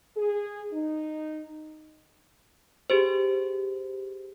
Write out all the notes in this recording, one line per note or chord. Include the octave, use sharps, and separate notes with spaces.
G#4
D#4
G4 G#4 C5